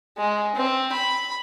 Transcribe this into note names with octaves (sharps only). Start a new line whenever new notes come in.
G#3
C4
B5